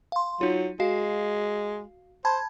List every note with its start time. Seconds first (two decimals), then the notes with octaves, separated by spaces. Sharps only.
0.12 F5 C6
0.41 F#3 D#4 F4
0.80 G#3 F#4 F5 C7
2.25 C5 A5 B5 G#6